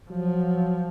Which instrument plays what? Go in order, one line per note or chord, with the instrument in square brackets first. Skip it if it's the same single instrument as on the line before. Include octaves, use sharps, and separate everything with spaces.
[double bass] F3 [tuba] F#3